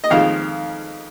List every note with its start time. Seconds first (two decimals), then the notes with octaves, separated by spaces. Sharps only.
0.04 D#5
0.10 F2 D#3 G#3 F5